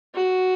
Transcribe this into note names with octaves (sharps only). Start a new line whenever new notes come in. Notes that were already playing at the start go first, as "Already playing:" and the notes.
F#4